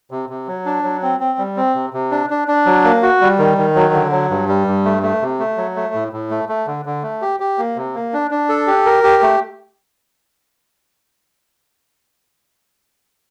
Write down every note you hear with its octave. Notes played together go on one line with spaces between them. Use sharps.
C3
C3
F#3
D4
F#3
C4
C4
G3
C4
C3
C3
D4
D4
D4
F#3
A#3
F#4
G3
D#3
D#3
F#3
D3
F#3
G2
G3
G2
A3
A3
C3
A3
F#3
A3
A2
A2
A3
A3
D3
D3
A3
G4
G4
A#3
C3
A#3
D4
D4
A4
G4
A#4
G4
A3